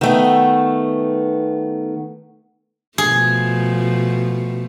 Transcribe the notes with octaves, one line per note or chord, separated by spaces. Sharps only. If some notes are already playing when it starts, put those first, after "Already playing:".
D#3 A3 B3
B2 F3 A3 G#4